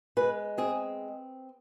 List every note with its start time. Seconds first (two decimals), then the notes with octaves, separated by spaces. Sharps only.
0.17 G#3 B4
0.58 C4 G#4